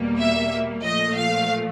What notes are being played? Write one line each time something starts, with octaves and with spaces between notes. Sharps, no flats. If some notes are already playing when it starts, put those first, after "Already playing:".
Already playing: E2 B2 G3 A#3
E5
A#2 F3 A3 D#5
F5